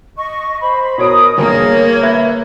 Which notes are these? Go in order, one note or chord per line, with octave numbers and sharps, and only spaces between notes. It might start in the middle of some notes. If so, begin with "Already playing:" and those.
D#5 C#6
C5 B5
B2 A#4 C#5 D#6 D7
G1 A#3 G#4 A#4 C#5
B4 E5 G#6